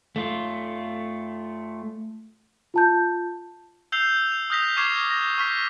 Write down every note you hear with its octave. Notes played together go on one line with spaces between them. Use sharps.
A3 F4
F4 A5 G6
E6 G6 C7 F7 G7
F7
D#6 F6 G6 A#6 B6 F7
C#6 D6 F6 G#6 C7 E7
A#6
C#6 F6 B6